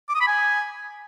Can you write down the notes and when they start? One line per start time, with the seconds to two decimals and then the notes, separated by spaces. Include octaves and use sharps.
0.09 D6
0.15 D#6
0.21 B5
0.27 G#5